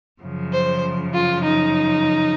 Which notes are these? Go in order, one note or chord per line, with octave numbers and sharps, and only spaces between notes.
F#2 C#3 F3
C5
F4
D#4